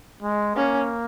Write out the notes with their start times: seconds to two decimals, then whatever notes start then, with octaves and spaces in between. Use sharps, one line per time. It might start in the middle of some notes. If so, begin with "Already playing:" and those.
0.22 G#3
0.56 A#3 C#4